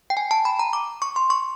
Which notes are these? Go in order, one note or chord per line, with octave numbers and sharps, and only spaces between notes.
G5
G#5
A5
B5
A#5
D6
C#6
C6
C#6